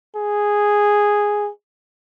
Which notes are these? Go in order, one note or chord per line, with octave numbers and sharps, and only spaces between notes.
G#4